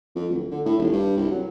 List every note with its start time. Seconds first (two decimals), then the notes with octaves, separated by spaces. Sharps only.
0.15 F2
0.30 D1
0.51 D3
0.65 A2
0.79 D#1
0.93 G2
1.17 C2
1.31 F#3